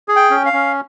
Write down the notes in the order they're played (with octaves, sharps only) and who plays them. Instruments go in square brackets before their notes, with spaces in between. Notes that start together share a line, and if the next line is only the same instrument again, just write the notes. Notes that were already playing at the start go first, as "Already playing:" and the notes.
[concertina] G#4
G5
C#4
F5
C#4